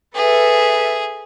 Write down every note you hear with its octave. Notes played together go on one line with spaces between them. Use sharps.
G#4 A4 B4 E5